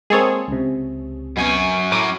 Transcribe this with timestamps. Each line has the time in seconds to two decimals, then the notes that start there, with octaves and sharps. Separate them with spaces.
0.10 G#3 A#3 C4 G#4 A4 C#5
0.48 C#2 C3
1.37 F#2 B2 C#4 G#5
1.92 F#2 A2 F#3 D6 D#7